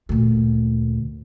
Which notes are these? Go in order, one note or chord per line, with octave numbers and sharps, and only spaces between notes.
D2 A#2